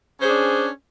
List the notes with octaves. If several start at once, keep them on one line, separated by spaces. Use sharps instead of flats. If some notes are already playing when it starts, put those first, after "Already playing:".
C#4 D4 G#4 C5